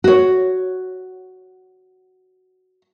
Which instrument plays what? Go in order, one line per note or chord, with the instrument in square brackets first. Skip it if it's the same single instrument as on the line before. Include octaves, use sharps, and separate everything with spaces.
[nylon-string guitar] F#4 C#5